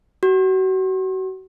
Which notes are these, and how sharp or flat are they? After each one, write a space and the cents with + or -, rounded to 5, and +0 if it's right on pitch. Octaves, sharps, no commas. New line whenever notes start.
F#4 +35